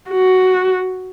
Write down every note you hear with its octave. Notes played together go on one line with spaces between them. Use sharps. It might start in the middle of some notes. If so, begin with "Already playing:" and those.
F#4